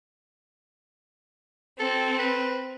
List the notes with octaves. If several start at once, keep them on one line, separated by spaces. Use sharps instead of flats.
C4 A4
B4